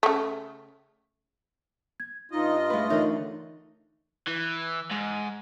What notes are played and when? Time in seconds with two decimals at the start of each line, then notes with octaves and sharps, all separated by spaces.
0.03 C#3 A3
2.00 G#6
2.31 G2 D#4 F4 D#5
2.70 G#3 A3 B4
2.90 D3 E3 D#4 A#4 C#5 E5
4.27 E3
4.91 G#2